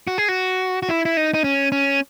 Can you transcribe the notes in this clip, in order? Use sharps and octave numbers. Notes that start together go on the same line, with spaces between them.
F#4
G#4
F#4
F#4
E4
E4
D#4
D#4
C#4
C#4